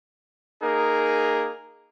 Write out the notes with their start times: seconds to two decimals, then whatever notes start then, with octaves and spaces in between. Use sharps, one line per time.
0.62 A#3 D#4 G#4 A#4